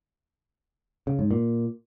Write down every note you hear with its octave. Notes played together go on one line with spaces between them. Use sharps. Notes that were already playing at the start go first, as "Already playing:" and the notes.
C#3
G#2
A#2